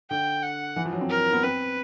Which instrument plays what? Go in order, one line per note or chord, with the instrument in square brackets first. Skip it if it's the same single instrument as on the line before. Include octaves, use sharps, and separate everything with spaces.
[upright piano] D3 [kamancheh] G5
[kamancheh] F#5
[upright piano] E3
F3
F#3
C4
[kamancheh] A#4
[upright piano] B3
[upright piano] C4 [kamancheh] B4